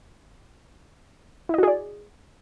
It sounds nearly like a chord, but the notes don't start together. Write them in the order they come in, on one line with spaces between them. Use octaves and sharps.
E4 D#5 F#4 G#4 D5